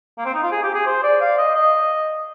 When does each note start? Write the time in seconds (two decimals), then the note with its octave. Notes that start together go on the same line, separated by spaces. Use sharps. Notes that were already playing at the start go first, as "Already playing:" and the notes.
0.18 A#3
0.25 C4
0.34 D#4
0.43 F4
0.51 G#4
0.63 G4
0.74 G#4
0.86 C5
1.03 D5
1.21 F5
1.38 D#5
1.55 D#5